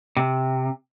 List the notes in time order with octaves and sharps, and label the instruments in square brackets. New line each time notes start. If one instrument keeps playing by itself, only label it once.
[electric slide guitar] C3